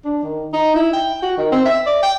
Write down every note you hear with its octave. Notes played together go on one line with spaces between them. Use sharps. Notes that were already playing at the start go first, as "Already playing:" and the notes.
D4
D#3
D#4
E4
G5
F#4
D#3
C4
E5
D5
G5